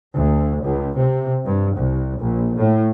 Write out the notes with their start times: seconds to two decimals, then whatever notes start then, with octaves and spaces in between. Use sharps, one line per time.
0.16 D2
0.65 C#2
0.98 C3
1.46 G2
1.77 C2
2.20 A#1
2.58 A2